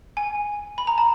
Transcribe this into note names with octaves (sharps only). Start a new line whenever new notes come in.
G#5
B5
A#5
A5